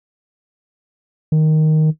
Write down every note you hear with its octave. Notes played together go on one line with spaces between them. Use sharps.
D#3